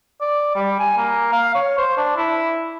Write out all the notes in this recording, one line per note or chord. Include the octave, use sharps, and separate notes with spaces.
D5
G3
G#5
A#3
F5
C#5
C5
D4
E4